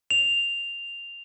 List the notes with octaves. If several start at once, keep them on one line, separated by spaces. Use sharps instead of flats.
F7